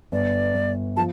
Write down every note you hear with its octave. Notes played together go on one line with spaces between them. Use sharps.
G1 D5
G1
F3 A5